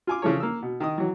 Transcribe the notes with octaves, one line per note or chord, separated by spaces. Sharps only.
F4 G#5 D6
C#3 E3 F3 A4 C#5
A#3 E6
B2
D#3 D#5 D#6
E3 F#3